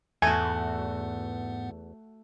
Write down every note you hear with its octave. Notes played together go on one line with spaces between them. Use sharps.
E2 G#2 A3 B3 F#4 F#5 G#5